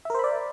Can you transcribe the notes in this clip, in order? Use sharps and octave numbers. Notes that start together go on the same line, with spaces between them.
A#4 C5 D5 E5 B5